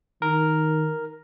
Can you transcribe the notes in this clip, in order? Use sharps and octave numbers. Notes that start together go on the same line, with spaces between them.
D#3 A#4